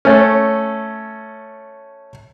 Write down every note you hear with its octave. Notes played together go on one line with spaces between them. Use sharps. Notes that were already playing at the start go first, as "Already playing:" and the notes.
A3 C#4